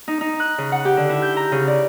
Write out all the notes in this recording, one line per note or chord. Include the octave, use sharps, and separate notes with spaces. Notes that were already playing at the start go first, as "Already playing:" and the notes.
D#4
D#4
F#6
C#3
F#5
G4
D3
E4
G6
A#5
C#3
D5